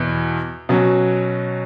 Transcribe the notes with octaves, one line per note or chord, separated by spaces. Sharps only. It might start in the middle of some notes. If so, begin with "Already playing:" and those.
Already playing: E2 B2
B2 F#3 C#4